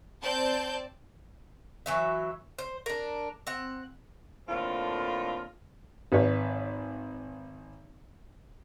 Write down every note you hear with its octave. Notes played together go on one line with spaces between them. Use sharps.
C4 D5 A5 G6
E3 F#3 E5
C5
D4 A#4
C4 F#5
A2 D3 A#3 C4 F4
G#1 B4 C#5